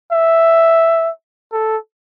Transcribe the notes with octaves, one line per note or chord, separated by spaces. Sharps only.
E5
A4